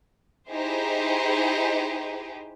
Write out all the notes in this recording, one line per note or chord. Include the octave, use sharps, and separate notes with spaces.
D#4 E4 G4 G#4 C5